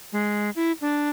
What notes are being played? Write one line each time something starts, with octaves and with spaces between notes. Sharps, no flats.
G#3
E4
D4